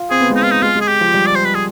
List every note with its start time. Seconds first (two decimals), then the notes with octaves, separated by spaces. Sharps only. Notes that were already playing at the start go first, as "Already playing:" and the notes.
Already playing: F4
0.11 C4 G#4
0.20 B3
0.30 G#3
0.36 D#4
0.40 B3
0.44 F4
0.51 D#4
0.62 G#3 F4
0.75 G#3
0.81 G#4
0.88 G4
1.01 F3
1.14 G3
1.26 D5
1.36 C5
1.45 B4
1.55 G#4